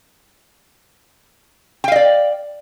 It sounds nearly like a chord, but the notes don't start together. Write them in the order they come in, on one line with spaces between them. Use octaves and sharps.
G5 F5 D#5 D5